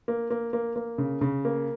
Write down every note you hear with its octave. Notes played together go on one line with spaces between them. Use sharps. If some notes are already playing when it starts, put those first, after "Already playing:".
A#3
A#3
A#3
A#3
C#3
C#3
A#3